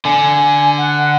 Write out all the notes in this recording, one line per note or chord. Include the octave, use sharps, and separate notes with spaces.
D3 G#5
F#5